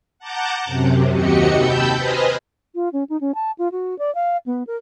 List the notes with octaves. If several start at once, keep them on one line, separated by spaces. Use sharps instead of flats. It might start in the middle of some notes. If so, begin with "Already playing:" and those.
F#5 A5 A#5 D6 G6
F#2 C3
D#2 C3 F#4 G4 D#5 C#7
G5 A5 B5 E6 G6
B4 C5 D#5 G#5 D#6 F6
F4
C#4
D#4
C#4
A5
F4
F#4
D5
F5
B3
A#4